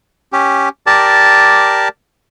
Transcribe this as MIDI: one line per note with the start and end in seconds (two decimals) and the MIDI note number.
0.32 0.69 61
0.32 0.69 67
0.86 1.88 67
0.86 1.88 70
0.86 1.88 74
0.86 1.88 81